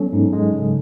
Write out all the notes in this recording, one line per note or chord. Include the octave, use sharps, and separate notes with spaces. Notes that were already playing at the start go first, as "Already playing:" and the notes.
Already playing: F#3 B3 C#4 A4
G#2
G#3
C#3